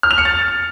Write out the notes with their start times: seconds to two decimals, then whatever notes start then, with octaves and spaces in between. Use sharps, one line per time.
0.03 F6
0.11 F7
0.18 C#7
0.25 A6